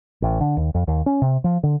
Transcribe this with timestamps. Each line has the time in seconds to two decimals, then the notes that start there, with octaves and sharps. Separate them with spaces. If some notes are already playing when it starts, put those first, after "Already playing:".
0.22 A1
0.41 D3
0.57 D#2
0.74 F2
0.87 D#2
1.06 C#4
1.22 C3
1.44 F3
1.63 D3